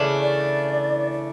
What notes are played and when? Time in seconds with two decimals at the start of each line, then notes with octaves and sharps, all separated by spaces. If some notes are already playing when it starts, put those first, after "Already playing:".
Already playing: C#3 E3 A3 D4
0.22 D5
1.11 D5